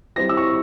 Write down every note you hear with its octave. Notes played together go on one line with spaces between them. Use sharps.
G3 C4 E4 A#6
E6
C#6